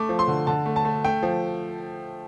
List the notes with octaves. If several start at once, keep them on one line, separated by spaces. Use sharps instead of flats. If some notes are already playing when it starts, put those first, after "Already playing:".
Already playing: A3 D6
F3
C6
D3
D3 A5
A3
A5
A3
A3 G5
F3